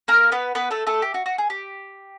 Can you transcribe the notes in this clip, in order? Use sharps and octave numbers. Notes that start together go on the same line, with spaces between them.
A#3 A#4
B3 B4
B3 B4
A3 A4
A3 A4
G4
F#4
F#4
G#4
G4